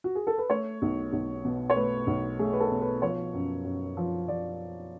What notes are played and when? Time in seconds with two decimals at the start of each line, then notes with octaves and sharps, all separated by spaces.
0.04 F#4
0.15 G#4
0.27 A4
0.38 B4
0.50 A3 C#5
0.82 B1
1.13 B1
1.45 B2
1.70 C#5
1.76 A3 B4
2.07 B1
2.39 A3 G#4
2.53 B4
2.60 A4
2.71 B2
2.81 B4
3.02 F3 C#5
3.33 F#2
3.65 F#2
3.97 F3
4.28 F3 D5